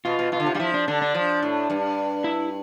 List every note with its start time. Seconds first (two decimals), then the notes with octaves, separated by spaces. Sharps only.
0.05 B2 F4
0.19 B2
0.32 B2 F4
0.40 D3
0.46 C3
0.55 G3 F4
0.59 F3 E4
0.74 D4
0.88 D3 D4
1.02 D4
1.15 F3
1.43 A2
1.70 G2
2.24 E4